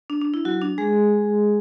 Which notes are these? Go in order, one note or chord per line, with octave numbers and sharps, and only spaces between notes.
D4
D4
E4
F#3 F#4
D4
G#3 G#4